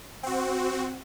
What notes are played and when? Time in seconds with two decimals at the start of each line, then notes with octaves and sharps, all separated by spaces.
0.23 C4 F#4